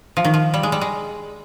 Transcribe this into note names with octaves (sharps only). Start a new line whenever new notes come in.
F3
D#3
F3
G3
G#3
G3
G#3